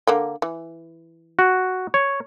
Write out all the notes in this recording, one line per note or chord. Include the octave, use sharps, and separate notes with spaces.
D3 A#3 G5
E3
F#4
C#5